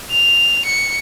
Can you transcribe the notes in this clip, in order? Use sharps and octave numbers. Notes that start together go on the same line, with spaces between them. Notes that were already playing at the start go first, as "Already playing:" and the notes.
F7
C#7